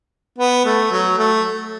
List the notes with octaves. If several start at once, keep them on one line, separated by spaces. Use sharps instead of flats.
B3
A3
F#3
A3